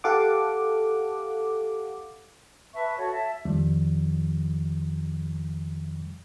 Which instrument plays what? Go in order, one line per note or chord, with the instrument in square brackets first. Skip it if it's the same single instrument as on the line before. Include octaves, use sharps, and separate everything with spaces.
[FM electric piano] G4 A4 F5 F#5 D6
[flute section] B4 E5 A5 C#6
F#4 A4 C#5
E5 A5
[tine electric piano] F2 D#3 F3 G3